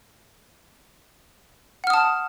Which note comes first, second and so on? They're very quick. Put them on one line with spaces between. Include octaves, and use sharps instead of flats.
F#5 F6 D#6 A5